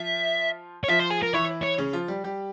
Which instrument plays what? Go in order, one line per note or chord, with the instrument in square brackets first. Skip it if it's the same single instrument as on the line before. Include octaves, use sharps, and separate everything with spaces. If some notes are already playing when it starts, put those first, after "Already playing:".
Already playing: [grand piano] F3 F4 [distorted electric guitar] E5
[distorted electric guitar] C#5
[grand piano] F3 F4 [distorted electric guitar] E5
[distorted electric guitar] C5
G#4
A#4
[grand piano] E3 E4 [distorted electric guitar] C#5
[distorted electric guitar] C#5
[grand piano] C#3 C#4
F3 F4
G3 G4
G3 G4